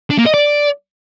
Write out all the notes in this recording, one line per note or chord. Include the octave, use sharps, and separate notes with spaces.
D4
A#3
D#5
D5